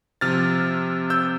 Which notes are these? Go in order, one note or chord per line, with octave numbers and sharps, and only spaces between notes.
C3 F3 F6 A6
E6 G6